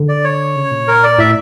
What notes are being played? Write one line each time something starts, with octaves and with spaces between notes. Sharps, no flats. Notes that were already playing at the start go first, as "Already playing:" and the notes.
Already playing: D3
D5
C#5
C#3
A#2
A#4
D5
A2 E5